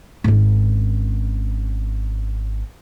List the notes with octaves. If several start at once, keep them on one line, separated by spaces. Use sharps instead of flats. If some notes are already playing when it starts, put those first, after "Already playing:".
G#1 C#4